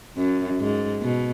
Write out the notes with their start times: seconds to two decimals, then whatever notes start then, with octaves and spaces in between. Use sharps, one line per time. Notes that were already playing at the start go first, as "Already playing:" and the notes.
0.17 F#2
0.60 G#2
1.02 B2